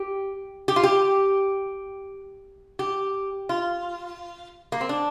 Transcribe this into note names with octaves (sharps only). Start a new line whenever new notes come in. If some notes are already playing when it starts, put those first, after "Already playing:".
Already playing: G4
G4
F4
G4
G4
F4
A#3
C4
D4